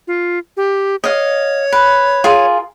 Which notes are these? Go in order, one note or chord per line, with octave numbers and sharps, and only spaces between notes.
F4
G4
C#5 D#5 F5
B4
F4 G#4 A#4